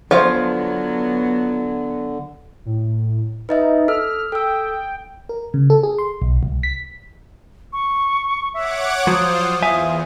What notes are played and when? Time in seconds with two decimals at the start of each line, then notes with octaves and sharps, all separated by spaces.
0.11 D3 F3 F#3 B3 C5 C#5 F5
2.65 A2
3.49 D#4 B4 D#5 E5
3.88 A4 E6 F6
4.32 A4 G5 E6
5.29 A#4
5.54 C#3
5.70 A4
5.83 G#4
5.98 C6
6.22 B1
6.43 C2
6.63 B6
7.73 C#6
8.54 C#5 E5 F#5 D6
9.07 F3 F#3 F4 C5 D#6
9.63 E2 E5 F5 G#5